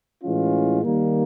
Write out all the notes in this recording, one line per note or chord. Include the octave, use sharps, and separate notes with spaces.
A2 E3 G#3 C#4 F4
D#2 D#3 G3 A#3